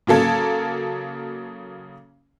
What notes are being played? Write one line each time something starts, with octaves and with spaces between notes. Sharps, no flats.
C#3 F#3 A#3 A4 G#6